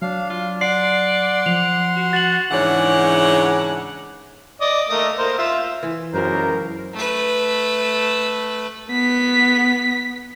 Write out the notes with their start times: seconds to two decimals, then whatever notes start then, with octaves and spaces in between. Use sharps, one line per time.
0.02 F#3 D4 F5
0.30 F4
0.61 D5 F#5 C6 C7
1.46 F3 F7
1.96 F#4
2.13 F#4 A6 F#7
2.51 G#2 C#3 E3 D4 C#5 F#5
4.61 D5 D#5
4.89 A3 A#3 D#5
5.19 A#3 C5
5.38 F4 E5
5.83 E3
6.13 C#2 F#2 A#4 C5
6.94 A3 B4
8.90 B3 B6